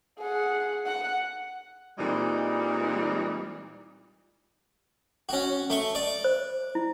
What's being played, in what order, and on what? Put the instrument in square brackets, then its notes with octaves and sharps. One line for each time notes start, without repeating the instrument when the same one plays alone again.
[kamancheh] G#4 F#5
F#5
[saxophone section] A#2 E3 G3 G#3 C4 D#4
[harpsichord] C#4 F#4
A3 C#6
D5
[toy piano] C5
E4